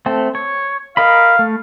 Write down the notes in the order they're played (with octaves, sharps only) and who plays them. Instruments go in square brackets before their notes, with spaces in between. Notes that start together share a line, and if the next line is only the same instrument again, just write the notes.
[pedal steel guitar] A3 C4 A4
C#5
[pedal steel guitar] A#4 D#5 B5 [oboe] F5
[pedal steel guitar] A3